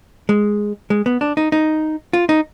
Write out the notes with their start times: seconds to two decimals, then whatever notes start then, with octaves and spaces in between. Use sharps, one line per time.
0.29 G#3
0.90 G#3
1.06 B3
1.21 D4
1.37 D#4
1.52 D#4
2.13 F4
2.29 D#4